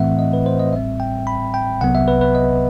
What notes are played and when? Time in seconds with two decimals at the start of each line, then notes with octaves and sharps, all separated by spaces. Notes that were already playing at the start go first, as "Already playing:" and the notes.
Already playing: A2 E3 A3 C4 E5 F#5
0.19 D#5
0.33 B4
0.46 C5
0.60 D#5
0.73 A1 A2 G3 C4 E5
1.00 G5
1.27 B5
1.54 G5
1.81 C2 C3 F#3 B3 F#5
1.95 E5
2.08 B4
2.21 B4
2.35 D#5